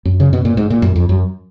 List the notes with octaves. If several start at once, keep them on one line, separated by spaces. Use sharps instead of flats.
F#2
C#3
B2
A#2
G#2
A#2
F#2
F2
F#2